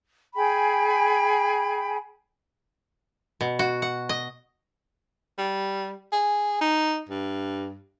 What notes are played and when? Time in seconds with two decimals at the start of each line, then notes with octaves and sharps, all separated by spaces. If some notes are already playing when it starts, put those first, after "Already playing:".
0.35 G#4 G5 G#5 B5
3.41 B2
3.59 F#4
3.82 F#5
4.09 D#5
5.38 G3
6.12 G#4
6.61 D#4
7.09 G2